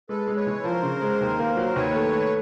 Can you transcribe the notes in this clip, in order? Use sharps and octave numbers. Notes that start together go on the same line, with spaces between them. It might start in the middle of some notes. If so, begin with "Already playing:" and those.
G#3 A4 B4
G#3
B4 C#5
E3
F3 A#4 C5
C#3
G#3
D#2
A#3
F#3
D#2 B4 C#5
A3
A3